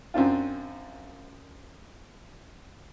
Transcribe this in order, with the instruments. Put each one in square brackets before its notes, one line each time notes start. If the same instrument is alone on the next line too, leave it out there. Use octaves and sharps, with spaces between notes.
[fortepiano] F#2 C4 D4 F4